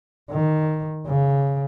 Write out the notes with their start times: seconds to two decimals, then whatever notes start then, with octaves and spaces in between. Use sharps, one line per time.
0.31 D#3
1.06 C#3